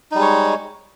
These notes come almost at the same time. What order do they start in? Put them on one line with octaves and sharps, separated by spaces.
D#4 G3 G#3 C#5